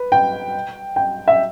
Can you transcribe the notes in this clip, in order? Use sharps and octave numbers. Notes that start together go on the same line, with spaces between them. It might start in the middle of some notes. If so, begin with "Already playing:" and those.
Already playing: B4
G5
G5
E5